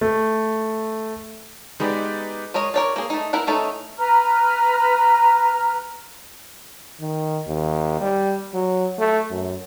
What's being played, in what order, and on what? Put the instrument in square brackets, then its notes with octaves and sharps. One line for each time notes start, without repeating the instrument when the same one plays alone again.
[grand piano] A3
[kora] G#3 B3 G4 [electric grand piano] D#4 B4 D5
[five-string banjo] G#3 A#4 C#5 D#5
A#4 C#5 D5
A#3 G#4
A3 D#4
E4 A#4 E5 F#5
E3 A3 C#4 D#4 A4
[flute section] B4 A#5 F6
[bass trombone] D#3
D#2
G3
F#3
A3
F#2